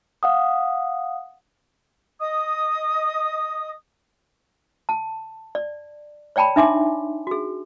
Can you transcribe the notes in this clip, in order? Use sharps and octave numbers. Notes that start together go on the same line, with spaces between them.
F5 F#5 D#6
D#5 D#6
A5
D5
C#5 D5 G5 A5 B5
D4 D#4 E5 G#5 C6 D6
F#4 G#4